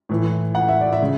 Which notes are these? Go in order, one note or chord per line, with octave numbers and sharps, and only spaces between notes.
A2 E3
F#5
E5
D5
E5
C#3